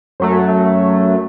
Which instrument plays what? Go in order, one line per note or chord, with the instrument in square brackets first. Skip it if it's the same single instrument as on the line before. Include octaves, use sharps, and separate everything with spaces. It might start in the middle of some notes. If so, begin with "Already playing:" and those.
[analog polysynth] F#2 F#3 A3